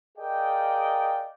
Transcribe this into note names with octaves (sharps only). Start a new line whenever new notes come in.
G#4 A#4 D5 D#5 F5 G5